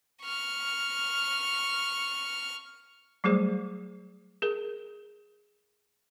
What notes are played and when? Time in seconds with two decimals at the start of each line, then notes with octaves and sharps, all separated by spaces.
0.22 C#6 F6
3.24 F#3 G3 A3 G#4 C5
4.42 G#4 A#4